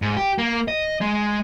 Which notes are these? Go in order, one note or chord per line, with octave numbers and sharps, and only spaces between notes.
G#2
G4
A#3
D#5
G#3